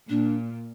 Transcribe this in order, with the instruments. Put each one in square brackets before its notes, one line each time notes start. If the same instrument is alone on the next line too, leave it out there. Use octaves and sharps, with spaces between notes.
[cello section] A#2 [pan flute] D4